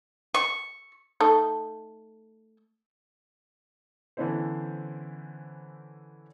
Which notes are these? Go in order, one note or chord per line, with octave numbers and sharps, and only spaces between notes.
C#6
A3 D#4 A4
D3 E3 B3 C#4 E4 C5